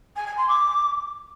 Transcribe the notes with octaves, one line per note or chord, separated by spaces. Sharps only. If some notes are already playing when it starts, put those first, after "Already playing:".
G#5
G#5
C6
D6